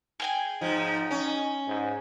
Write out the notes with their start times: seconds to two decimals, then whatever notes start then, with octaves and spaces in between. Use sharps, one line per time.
0.20 G#4 G5 G#5
0.61 G#2 F3 D#4
1.11 C#4
1.67 G#2